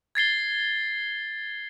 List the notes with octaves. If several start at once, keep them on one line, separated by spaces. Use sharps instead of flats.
G#6 A6 C7 G7